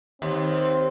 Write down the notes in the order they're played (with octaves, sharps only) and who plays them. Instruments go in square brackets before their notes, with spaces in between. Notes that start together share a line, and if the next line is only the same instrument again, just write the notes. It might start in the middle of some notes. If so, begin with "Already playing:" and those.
[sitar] D#2 [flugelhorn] C4